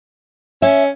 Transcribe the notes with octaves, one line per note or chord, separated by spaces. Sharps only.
C#4 E5